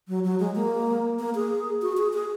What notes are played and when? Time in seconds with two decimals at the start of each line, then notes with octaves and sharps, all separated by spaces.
0.08 F#3
0.24 F#3
0.40 G#3
0.55 A#3
1.19 A#3
1.35 G#4
1.82 F#4
1.97 G#4
2.13 G#4